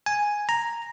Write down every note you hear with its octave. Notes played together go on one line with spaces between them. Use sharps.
G#5
A#5